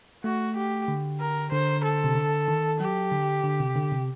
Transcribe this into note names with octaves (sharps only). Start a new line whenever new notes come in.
A3 F#4
G4
D3
A#4
D3 C5
A4
C3
D3
D#3
F#3 G4
D3
D3
C3
D3
C3